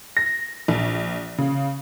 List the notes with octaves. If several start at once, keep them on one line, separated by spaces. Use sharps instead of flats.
A#6
A#1
C#3